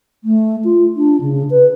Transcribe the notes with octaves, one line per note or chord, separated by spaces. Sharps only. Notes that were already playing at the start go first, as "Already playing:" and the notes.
A3
F4
D4
C#3
B4